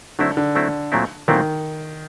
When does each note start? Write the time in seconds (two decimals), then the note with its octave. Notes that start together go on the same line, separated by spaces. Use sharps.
0.19 D3 F#3 A3 C4 E4
0.37 D3
0.55 F#3 A3 C4 E4
0.92 A#2 F#3 A3 C4 E4
1.28 A#2 D#3 F#3 A3 C4 E4